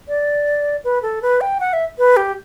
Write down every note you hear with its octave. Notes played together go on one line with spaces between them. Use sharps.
D5
B4
A4
B4
G5
F#5
E5
B4
G4